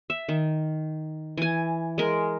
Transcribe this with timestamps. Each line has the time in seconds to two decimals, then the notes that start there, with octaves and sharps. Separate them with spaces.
0.10 E5
0.29 D#3
1.37 E3 G#5
1.98 G#3 A#4